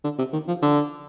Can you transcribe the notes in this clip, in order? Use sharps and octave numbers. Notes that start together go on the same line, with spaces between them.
D3
C3
D#3
F3
D3